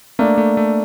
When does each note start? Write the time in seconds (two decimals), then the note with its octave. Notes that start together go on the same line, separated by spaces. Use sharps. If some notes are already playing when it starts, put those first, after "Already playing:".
0.19 A3 A#3 D4
0.38 A3
0.57 A3